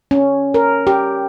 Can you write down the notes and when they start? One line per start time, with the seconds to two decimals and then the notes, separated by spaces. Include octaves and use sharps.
0.11 C#4
0.54 A#4
0.87 G4